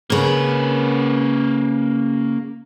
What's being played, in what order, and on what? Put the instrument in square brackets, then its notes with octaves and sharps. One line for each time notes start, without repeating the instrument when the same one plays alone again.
[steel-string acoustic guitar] C#3 A#4 [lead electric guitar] A#3 B4